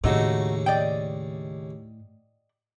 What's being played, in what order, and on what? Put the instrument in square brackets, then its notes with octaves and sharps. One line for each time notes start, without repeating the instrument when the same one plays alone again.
[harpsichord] D#2 C#3 [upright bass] A2 [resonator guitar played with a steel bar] A3 D#4 F#4
[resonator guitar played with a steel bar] D5 D#5 G5